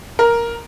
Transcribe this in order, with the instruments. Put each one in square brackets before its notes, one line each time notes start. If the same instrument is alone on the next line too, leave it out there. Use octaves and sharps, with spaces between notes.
[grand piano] A#4